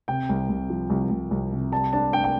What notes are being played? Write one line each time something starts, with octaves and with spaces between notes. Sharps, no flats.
C3 G5
C2
C2
F3
C2
C2
C2
C3
G3 A5
D4 A5
D4 G5
G5